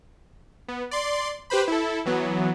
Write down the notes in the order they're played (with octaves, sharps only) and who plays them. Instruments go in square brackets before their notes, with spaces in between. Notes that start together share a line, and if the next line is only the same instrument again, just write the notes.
[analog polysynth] B3
D5 C6
G4 B4 C5 B5
E4 A4
E3 F#3 B3